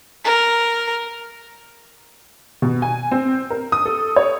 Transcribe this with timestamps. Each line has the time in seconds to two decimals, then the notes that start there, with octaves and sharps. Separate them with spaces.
0.24 A#4
2.62 B2
2.82 G#5
3.11 C4
3.50 A#4
3.72 D#6
3.86 A4
4.16 C#5